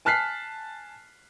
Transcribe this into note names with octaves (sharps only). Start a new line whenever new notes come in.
G#5 A5 F6 F#6 B6 C7